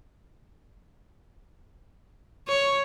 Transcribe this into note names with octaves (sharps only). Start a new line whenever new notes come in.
C#5